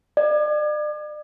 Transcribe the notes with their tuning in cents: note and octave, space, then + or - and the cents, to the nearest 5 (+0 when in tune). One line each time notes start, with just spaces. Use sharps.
D5 +40